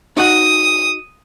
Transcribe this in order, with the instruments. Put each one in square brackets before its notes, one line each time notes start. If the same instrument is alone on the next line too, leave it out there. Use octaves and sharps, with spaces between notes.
[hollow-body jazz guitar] D#4 F#4 F#5 [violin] D#6